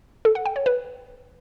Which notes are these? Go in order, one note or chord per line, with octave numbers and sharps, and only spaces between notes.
A4
F#5
G5
C#5
B4